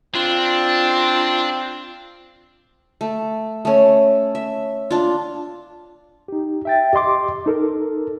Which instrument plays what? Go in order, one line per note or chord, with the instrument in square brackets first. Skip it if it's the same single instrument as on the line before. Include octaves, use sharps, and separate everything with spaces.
[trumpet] C4 [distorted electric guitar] D4 [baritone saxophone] F4
[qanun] A3
A3 C#4
E5
D4 F4
[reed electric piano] D#4 G4
E5 G5 A6
G4 D#5 C6 D6
D#4 A4 A#4